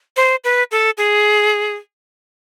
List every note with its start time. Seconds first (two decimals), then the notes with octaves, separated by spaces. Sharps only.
0.17 C5
0.44 B4
0.71 A4
0.98 G#4